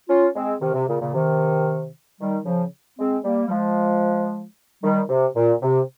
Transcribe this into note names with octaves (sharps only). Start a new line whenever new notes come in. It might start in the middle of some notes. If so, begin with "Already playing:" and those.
C#4 F4
G#3 C4
C3 D#3
C3
A#2 C#3
A#2 C#3
C3 D#3
D#3 G3
C#3 F3
G#3 C4
G3 A#3
G3
F3 G#3
D#3 G3
C3
A#2
C3